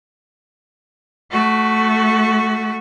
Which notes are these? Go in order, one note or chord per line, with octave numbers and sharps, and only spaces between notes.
A3 F#4